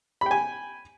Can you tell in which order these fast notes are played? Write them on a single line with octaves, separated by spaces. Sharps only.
B5 G5 G#5